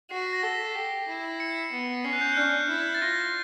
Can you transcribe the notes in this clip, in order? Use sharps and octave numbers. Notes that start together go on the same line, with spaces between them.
F#4 C7
B6
A#6
A4 A#6
B6
C7
G4
E4
C#7
B3
C#4 C7
F#6
G6
F#6
D4 F6
E4
A6
F4 A#6